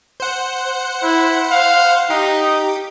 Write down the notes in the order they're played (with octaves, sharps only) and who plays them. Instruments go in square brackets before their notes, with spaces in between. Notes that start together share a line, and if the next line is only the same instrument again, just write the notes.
[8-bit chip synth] C5 F#5
[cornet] E4
F5
[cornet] D#4 [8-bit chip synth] G4